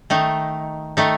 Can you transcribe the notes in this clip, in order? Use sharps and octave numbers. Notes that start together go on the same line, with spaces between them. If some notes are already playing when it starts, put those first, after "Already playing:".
D#3 A3 D#4
D#3 A3 D#4